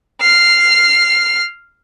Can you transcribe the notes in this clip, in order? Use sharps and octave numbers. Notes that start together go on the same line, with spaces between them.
F6 C7